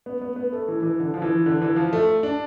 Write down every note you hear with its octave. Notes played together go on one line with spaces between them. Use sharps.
B3
B3
B3
A3
E3
E3
D3
F3
E3
D3
E3
F3
A3
D4